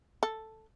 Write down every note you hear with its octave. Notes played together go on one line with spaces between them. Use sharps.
A4